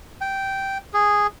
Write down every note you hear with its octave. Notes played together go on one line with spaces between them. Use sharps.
G5
G#4